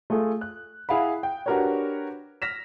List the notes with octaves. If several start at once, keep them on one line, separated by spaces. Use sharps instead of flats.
A3 F4 G#4 A4
F#6
E4 G#4 F5 F#5 B5
G5
D4 F#4 G4 A#4 B4 C#5
F6 A#6 B6 E7